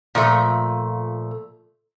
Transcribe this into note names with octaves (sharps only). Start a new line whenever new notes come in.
A#2 F3 A3